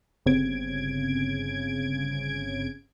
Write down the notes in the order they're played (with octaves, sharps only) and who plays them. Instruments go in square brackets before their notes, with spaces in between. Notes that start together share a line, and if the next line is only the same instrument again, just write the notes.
[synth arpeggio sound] G1 C#3 C4 G#6 D7